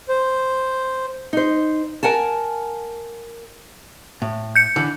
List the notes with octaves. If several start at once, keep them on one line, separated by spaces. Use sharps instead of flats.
C5
D#4 C5
A#4 F#5 G#5 A5
A2
G6 C#7
D3 E3